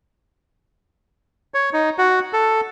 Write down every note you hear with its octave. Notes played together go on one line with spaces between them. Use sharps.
C#5
D#4
F#4
A4